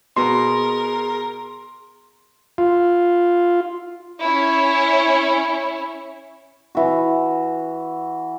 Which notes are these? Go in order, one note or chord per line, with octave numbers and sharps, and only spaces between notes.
B2 G#4 A#4 C6
F4
C#4 E4 C#5
E3 F#4